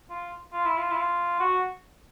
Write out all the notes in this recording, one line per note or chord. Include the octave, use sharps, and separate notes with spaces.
F4
F4
E4
F4
E4
F4
F#4